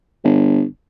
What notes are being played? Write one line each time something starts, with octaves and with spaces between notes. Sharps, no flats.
G1